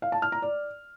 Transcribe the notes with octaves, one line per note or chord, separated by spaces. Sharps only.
F5
A5
F6
A#5
D5